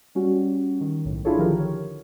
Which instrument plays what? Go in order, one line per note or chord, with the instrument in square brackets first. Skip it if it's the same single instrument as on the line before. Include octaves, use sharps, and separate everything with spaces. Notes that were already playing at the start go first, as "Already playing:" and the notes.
[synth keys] G3 C#4 F#4
D#3
B1 A2
D4 E4 F4 G#4 A4 C#5
D3 D#3 F3 G4 A#4
C#5